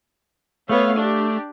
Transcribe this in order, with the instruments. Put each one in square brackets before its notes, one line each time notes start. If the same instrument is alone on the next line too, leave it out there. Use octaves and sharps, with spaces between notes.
[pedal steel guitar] A3 [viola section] B3 C#5 F5
[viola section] D4 G4